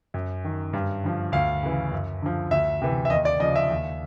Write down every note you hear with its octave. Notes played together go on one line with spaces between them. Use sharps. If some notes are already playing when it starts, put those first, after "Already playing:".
F#2
D#3
G2
D3 F3
D2 F5
C#3 E3
F#2
D3 F3
D2 E5
C3 E3
E5
D#2 D#5
D5
C#3 F3 D#5
E5
D#2